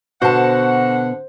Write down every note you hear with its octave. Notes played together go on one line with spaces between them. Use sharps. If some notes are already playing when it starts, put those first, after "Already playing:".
B2 D3 F#4 C5 F#5 A5